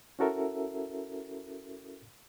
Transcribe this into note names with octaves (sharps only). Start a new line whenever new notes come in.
C#4 E4 F#4 A4 A#4 E5